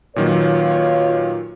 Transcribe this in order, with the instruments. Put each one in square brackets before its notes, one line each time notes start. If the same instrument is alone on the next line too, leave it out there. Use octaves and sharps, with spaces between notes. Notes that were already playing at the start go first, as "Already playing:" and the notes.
[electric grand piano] A#2 D#3 F#3 [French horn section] F4 B4 C#5